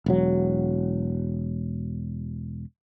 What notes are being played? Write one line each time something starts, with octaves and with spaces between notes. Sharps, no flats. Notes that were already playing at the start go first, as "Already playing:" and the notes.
E1 F#3